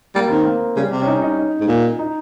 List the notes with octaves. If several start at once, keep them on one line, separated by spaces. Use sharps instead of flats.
G3 A#3
D#3 C4
A#3
C#3 G3
C3
C#4
D#4
D#4
D#4
G#2
A#2
D#4